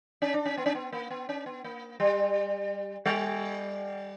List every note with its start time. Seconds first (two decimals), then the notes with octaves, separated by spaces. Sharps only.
0.22 C#4
0.34 D4
0.45 C#4
0.57 B3
0.66 C#4
0.75 B3
0.92 A#3
1.10 B3
1.29 C#4
1.46 B3
1.64 A#3
2.00 G3
3.05 G3